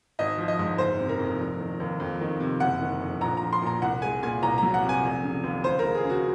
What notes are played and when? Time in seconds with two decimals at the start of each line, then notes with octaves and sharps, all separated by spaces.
0.19 G#1 D#5
0.38 F3
0.48 D#5
0.59 G#2
0.78 F#1 C5
0.99 C3
1.09 A#4
1.19 F2
1.39 F1
1.60 D#3
1.80 D#2
2.00 F2
2.21 D#3
2.40 C3
2.60 F#1 F#5
2.82 D#3
3.01 F2
3.21 A#1 A#5
3.37 F3 A#5
3.53 C6
3.62 A#2 A#5
3.82 C2 F#5
4.02 G#3 G#5
4.23 A#2 G#5
4.42 C2 A#5
4.58 F#3 A#5
4.74 F#5
4.84 C3
4.89 G#5
5.03 F1
5.23 C#3
5.44 D#2
5.64 C#2 C5
5.79 A#4
5.84 G#3
5.95 G#4
6.04 C#3
6.10 F#4